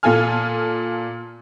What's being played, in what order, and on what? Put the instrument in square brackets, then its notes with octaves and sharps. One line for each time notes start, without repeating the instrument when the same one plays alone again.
[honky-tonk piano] A#2 F4 A4 G#5 F6